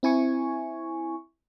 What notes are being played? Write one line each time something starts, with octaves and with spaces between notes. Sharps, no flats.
C4 E4 G#5 C#6